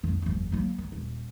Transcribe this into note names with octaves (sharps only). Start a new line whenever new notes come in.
F2 D#3
F#1 E2
F#3 A#3
D#3
D#1